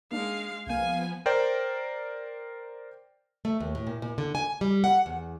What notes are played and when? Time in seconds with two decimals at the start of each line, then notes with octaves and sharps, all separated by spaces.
0.12 G#3 A#3 D4 D#4 F5
0.67 C2 F3 A#3 B3 F5 G#5
1.26 A#4 C5 D5 G5
3.45 A3
3.60 D#2
3.75 A2
3.87 A#2
4.02 A#2
4.18 D3
4.35 G#5
4.61 G3
4.84 F#5
5.06 E2